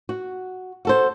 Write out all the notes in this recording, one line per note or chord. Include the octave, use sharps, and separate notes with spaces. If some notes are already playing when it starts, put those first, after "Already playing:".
F#4
F#4 A4 C5